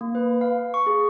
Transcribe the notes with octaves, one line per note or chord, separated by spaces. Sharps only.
A#3
B4
F5
C#6
G#4